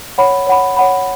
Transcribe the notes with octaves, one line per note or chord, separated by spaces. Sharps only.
C#5 F#5 B5
C#5 F#5 B5
C#5 F#5 B5